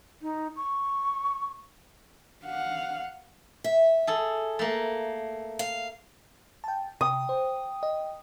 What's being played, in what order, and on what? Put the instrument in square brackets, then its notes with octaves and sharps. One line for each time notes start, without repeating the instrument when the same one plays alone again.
[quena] D#4
C#6
[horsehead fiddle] F5 F#5
[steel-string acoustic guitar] E5
[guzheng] G#4 A4
A3 A#3
[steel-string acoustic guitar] F5
[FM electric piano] G5 A5
[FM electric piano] C3 [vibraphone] G5 [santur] D#6
[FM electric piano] C5
D#5